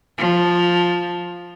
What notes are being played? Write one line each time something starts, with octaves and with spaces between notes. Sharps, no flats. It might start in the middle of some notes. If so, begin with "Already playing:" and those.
F3